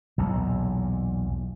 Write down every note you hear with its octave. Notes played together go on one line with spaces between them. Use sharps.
B1 E2 A#2